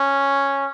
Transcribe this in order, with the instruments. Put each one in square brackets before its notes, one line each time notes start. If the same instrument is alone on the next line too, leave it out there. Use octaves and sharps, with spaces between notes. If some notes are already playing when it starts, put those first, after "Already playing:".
Already playing: [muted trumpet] C#4